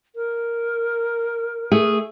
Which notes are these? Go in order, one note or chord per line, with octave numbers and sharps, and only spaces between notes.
A#4
A3 G#4